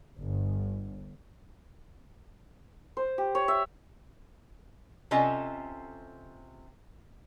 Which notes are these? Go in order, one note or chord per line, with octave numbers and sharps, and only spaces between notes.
G1
C5
G4
C#5
E5
C3 C#4 F4 A4 D#5